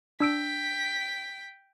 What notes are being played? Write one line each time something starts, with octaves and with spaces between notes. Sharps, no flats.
D4 G5 E6 B6 D7